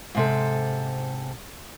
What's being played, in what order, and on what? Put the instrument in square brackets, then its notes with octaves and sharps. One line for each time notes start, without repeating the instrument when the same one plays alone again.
[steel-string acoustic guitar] G#2 C3 A4